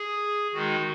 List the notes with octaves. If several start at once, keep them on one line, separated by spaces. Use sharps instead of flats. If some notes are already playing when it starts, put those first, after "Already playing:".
Already playing: G#4
D#3 G#3 D#4 F#4